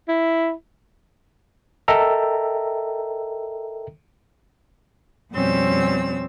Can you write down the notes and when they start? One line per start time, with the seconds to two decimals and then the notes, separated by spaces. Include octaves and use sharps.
0.08 E4
1.88 A4 A#4 D#5 E5 G5 A#5
5.33 F2 B2 G3 C4 C#4 E6